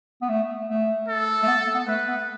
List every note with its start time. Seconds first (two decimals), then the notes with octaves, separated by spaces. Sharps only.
0.22 B3
0.29 A3
0.69 A3
1.08 A4
1.43 A3
1.48 B3
1.75 B3
1.88 A3 B4
2.08 B3